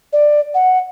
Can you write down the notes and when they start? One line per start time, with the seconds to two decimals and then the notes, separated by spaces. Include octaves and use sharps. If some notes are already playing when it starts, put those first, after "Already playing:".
0.13 D5
0.54 F#5